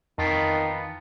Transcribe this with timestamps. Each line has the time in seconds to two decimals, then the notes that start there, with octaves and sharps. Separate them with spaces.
0.18 F2 D#3 E3 B3 F4 A5 A#6